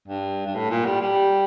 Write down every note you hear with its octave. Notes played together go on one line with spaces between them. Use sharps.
G2
G2
A2
A#2
G3
G3